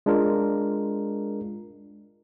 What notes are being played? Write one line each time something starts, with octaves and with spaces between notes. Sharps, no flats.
G#3 D4 F4 A#4